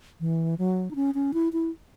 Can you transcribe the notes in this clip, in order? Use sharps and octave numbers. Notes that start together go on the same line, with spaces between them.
E3
F#3
D#4
C#4
C#4
E4
E4